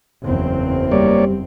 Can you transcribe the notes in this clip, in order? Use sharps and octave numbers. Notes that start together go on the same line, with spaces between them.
F#1 E2 C4
G3 A#3 C#5 D5